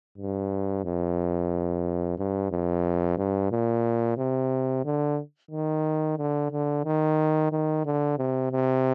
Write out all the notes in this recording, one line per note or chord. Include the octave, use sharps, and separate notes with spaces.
G2
F2
G2
F2
G2
A#2
C3
D3
D#3
D3
D3
D#3
D#3
D3
C3
C3